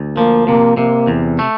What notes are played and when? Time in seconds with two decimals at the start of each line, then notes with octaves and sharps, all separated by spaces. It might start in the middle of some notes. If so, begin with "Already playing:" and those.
Already playing: D2
0.17 F3 A#3
0.48 C3 A#3
0.77 C3 A#3
1.07 E2
1.39 A3